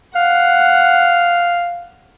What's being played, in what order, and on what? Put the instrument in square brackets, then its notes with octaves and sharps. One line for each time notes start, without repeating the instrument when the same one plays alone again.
[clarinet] F5 [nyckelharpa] F#5